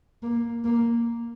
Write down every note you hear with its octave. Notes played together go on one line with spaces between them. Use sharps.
A#3
A#3